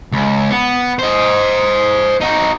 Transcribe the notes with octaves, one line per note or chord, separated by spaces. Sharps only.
C#2
B3
C5 D#5
D#4 F#4